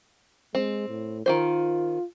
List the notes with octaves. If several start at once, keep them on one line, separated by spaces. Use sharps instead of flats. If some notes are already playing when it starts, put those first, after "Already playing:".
G#3 C4
A2
D#3 C4 F4 C5